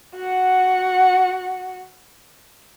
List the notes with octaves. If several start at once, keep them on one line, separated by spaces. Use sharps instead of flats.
F#4 F#5